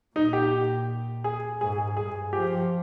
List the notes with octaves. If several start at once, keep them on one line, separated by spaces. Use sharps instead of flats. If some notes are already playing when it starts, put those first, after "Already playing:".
A#2 D#4
G4
G#4
G#2 G#4
G#4
G2 G#4
F3 G4